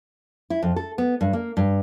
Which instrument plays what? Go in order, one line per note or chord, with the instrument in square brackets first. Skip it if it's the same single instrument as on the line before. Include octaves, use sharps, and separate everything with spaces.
[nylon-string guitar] E4
F2
A4
B3
G2
A#3
G2